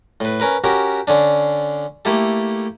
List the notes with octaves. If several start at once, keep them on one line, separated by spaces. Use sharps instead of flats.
A2 B4
C#4 A#4 B4
C#4 F#4 G4 A#4
D3 C#4 D4
A3 A#3 E4 G4 A4